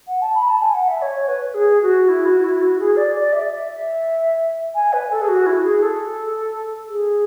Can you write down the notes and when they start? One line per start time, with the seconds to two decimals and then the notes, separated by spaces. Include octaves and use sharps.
0.07 F#5
0.21 A5
0.34 B5
0.48 A5
0.62 G#5
0.74 F#5
0.87 E5
1.01 C#5
1.17 C#5
1.28 B4
1.54 G#4
1.82 F#4
2.08 E4
2.26 F#4
2.44 E4
2.61 F#4
2.79 G#4
2.96 D5
3.14 D5
3.32 E5
3.51 E5
3.68 E5
4.75 G#5
4.93 B4
5.10 A4
5.21 G#4
5.28 F#4
5.46 E4
5.64 G#4
5.82 A4
6.89 G#4